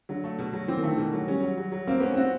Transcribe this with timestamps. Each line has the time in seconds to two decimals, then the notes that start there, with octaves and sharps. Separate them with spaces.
0.09 D3 F#3
0.24 A3
0.38 B2
0.53 F#3
0.68 E3 C4
0.77 D#3
0.83 D3 A3
0.94 B2 D#3
1.13 F#3
1.27 G3 C#4
1.43 F#3
1.57 F#3
1.72 F#3
1.87 A#3 C4
2.00 B3 C#4
2.14 C4 F#4